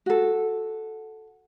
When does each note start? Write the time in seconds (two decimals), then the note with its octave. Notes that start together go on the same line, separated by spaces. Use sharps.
0.06 F#4 A4